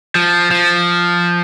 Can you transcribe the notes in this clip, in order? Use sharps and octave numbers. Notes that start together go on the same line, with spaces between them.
F3
F3